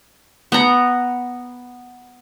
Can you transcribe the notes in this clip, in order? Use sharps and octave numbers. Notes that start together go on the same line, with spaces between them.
B3 A#5